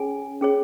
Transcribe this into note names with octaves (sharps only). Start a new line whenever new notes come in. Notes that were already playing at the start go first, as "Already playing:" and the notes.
Already playing: C#4 G#4 C#5 G#5
C#4 G#4 C#5